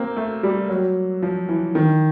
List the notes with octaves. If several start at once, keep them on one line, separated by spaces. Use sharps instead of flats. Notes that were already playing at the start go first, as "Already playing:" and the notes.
Already playing: A#3 C4
A3
G3
F#3
F3
E3
D#3